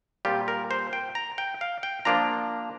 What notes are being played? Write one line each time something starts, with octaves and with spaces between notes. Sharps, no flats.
A#2 G3 C4 F4 G4
A#4
C5
G5
A#5
G5
F5
G5
F3 A#3 D4 F4 A#5